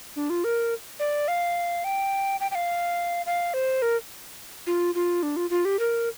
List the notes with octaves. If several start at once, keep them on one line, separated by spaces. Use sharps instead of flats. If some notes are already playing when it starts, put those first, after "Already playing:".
D4
F4
A#4
D5
F5
G5
G5
G5
F5
F5
C5
A#4
F4
F4
D4
F4
F4
G4
A#4